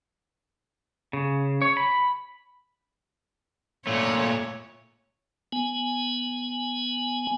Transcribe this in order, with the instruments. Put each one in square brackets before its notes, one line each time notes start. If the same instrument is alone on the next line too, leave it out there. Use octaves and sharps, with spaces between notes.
[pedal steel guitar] C#3
C#5
B5
[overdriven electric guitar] A#2 A3 [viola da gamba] C#5
[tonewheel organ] B3 G#5